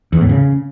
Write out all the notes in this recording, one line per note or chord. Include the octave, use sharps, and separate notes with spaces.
E2
A2
C#3